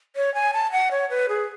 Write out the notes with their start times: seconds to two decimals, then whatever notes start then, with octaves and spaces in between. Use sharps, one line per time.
0.16 C#5
0.34 G#5
0.53 A5
0.72 F#5
0.91 C#5
1.10 B4
1.29 G#4